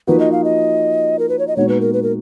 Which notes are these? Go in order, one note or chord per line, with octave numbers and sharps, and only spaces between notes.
F3 A#3 D#4 F#4 B4
D#5
F5
D#5
A#4
B4
C#5
D#5
A#2 G#3 B3 D#4 F#4 C#5
B4
A#4
B4
A#4